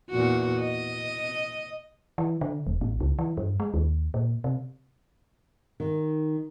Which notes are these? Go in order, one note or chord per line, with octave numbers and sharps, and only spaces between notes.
E2 A#2 F#4
D#5
E3
D3
E1
A1
C#2
E3
G2
G#3
D#2
A#2
C3
D#3